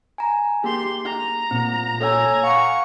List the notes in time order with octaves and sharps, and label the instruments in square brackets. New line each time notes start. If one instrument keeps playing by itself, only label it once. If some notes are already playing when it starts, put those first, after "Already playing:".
[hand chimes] G#5 A#5
[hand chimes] A#3 G#4 [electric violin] G4 C6
[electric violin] A#5
[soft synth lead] A#2 [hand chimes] C4
[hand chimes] A4 C#5 E6 [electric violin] G#5 A#5
[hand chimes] F5 F#5 [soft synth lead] C#6